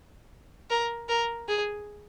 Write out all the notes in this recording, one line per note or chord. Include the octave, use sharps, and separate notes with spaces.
A#4
A#4
G#4